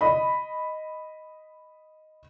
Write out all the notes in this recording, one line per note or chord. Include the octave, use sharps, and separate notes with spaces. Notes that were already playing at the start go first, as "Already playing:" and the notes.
D#5 B5